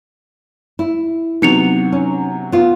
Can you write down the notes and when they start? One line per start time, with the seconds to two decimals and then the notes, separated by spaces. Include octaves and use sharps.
0.79 E4
1.42 C3 F#3 B3 D#4 C#7 F7
1.92 C#4
2.52 B3 F4